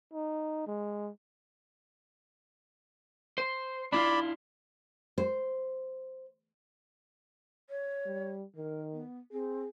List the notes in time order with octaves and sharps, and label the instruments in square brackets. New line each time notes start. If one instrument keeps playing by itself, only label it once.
[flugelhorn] D#4
G#3
[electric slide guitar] C5
[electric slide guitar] D4 E4 F4 [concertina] D5 B5
[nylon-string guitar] C5
[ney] C#5
[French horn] G3
[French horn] D#3 [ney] A#4
[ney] B3
[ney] C4 [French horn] G#4